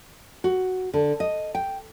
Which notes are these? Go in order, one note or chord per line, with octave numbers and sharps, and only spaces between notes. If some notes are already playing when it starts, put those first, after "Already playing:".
F#4
D3
D#5
G5